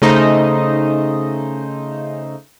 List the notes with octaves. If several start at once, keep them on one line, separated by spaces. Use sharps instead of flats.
C#3 A3 D#4 C5 D#5